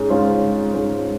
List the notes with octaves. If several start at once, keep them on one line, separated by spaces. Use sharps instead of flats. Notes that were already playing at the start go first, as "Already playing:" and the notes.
Already playing: G#2 G#3 C#4
G#2 G#3 C#4 F4
G#2 G#3 C#4 F4